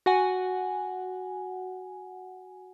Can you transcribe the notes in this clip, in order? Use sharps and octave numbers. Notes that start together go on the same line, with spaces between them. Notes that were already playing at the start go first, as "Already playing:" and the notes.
F#4 F#5 G#5